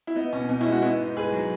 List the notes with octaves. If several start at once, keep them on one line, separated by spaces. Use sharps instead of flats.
E4
B3 D#4
B2 C#4
B2 D#4
C#4 E4
G#3
D#4 F#4
B3 C#4 E4
G#2 D#4
G#2 G#4 B4
F#3